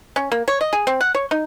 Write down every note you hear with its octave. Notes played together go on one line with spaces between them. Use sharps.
C#4
A#3
C#5
D#5
G#4
C4
F#5
C#5
D#4